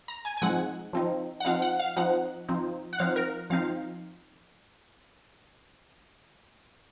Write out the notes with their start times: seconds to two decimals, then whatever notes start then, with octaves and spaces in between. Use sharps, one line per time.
0.08 A#5
0.25 G#5
0.37 G#5
0.42 F3 G#3 C4 D#4 F#5
0.93 F3 C4 D#4
1.40 F#5
1.45 F3 C4 D#4 F5
1.62 F#5
1.80 F5
1.96 F3 C4 D#4 F#5
2.49 F3 C4 D#4
2.93 F#5
2.99 F3 C4 D#4 F5
3.16 A#4
3.50 F3 C4 D#4 F5